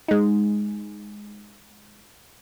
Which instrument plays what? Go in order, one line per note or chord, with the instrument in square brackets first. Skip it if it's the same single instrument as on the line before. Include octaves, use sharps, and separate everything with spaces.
[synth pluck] G#3 D#4